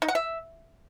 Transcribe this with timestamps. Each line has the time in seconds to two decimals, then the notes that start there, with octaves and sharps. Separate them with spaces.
0.02 D#4
0.08 F#5
0.15 E5